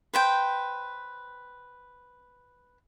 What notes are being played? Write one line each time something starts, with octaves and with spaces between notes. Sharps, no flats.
B4 C5 G5